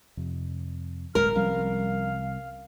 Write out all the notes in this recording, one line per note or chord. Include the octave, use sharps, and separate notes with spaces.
F2 C3
D1 G2 B2 G#3 A#4 F6
C2 F3 G3 C#4 F5